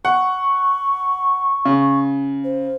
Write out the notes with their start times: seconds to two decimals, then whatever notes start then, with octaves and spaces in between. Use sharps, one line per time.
0.05 F#5 C#6
1.65 C#3
2.44 C5